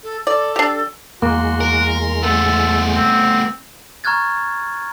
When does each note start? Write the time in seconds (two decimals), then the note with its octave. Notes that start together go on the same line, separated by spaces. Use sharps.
0.03 A4
0.27 A4 D5
0.56 D4 G4
1.22 E2 G#3 A#3 F#4 C6
1.61 A#4
2.23 A3 B3 A4
2.94 C4
4.04 A#5 C#6 F6 F#6 G#6 A6